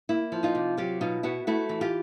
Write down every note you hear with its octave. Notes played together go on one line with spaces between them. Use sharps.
A#3 E4
F3
D#4 F4
C3
F#3 F4 G4
B2 D#4 F4
B3 E4 F#4
A3 E4 F#4
E3
F4 G4